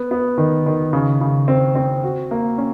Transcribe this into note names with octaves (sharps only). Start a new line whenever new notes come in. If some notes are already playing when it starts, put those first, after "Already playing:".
Already playing: B3
B3
D#3
D#3
C#3
C#3
C4
C4
F#4
A#3
C#4